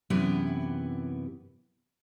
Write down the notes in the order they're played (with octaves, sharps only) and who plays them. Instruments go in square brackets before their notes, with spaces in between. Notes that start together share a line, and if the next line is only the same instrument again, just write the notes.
[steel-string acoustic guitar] F#2 C3 E3 B3 E4 G4